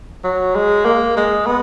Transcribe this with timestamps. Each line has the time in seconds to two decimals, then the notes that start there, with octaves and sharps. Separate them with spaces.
0.24 F#3
0.55 G#3
0.85 A#3
1.17 G#3
1.46 B3